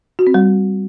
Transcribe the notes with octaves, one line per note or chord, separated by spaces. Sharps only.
F#4
C4
G3